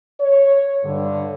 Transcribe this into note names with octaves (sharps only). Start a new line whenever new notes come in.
C#5
G2 D3